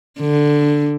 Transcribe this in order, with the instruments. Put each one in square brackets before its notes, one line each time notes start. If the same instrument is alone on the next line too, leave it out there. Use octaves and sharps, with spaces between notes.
[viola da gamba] D3